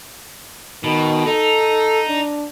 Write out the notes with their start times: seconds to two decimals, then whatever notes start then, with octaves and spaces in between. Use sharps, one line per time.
0.84 B2 D#3
1.26 D#4 A4
2.09 D4